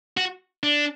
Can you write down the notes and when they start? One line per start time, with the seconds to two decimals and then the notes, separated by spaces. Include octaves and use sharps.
0.17 F#4
0.63 D4